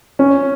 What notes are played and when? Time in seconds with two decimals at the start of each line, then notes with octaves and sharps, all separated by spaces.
0.19 C#4